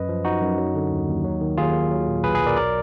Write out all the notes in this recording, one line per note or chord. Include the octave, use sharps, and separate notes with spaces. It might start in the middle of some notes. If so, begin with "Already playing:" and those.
Already playing: F#2 B4 D#5
F3
F3 D#4 F#4
F#2
F#3
D3
D#2
D#2
F#3
D#3
D#2 F4 G#4
D#2
F#3
A#2
B1 G#4 B4
G#4 B4
B1
A#4 D5
F#3 A#4 D5